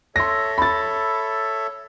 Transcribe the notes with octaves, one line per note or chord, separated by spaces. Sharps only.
A4 C#5 E5 C6 A#6
B5 A6